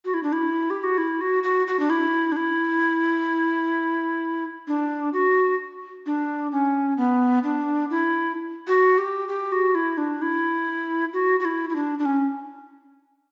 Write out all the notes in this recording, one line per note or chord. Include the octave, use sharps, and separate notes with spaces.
F#4
E4
D4
E4
G4
F#4
E4
F#4
F#4
F#4
D4
E4
D4
E4
D4
F#4
D4
C#4
B3
D4
E4
F#4
G4
G4
F#4
E4
D4
E4
F#4
F#4
E4
E4
D4
D4
C#4